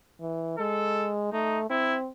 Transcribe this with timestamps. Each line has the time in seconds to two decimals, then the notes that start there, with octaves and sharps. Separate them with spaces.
0.22 E3
0.58 G#3 A4
1.33 A3 D#4
1.70 C4 E4